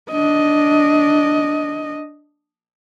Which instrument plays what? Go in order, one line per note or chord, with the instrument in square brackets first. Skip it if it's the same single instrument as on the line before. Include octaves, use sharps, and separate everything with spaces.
[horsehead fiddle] D4 D#5